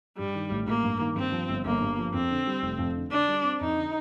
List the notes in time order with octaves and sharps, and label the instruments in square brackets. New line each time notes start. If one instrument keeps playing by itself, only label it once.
[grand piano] G2 [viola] G3
[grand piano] D#3
A1
[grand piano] A1 [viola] A#3
[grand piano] G2
D#3
[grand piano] G2 [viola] C4
[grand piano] F3
G1
[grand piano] G1 [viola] A#3
[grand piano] G2
F3
[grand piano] F2 [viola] C4
[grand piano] D3
G3
F1
F2
D3
[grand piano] D3 [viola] D4
[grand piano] G3
C4
[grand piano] F2 [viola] D#4
[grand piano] D3